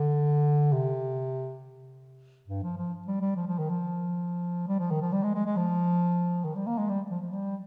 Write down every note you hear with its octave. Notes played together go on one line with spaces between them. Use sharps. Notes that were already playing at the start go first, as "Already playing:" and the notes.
Already playing: D3
C3
G2
F3
F3
G3
G3
F3
F3
D#3
F3
G3
F3
D#3
F3
G3
G#3
G#3
G#3
F3
D#3
G3
A#3
G#3
G3
F3
F3
G3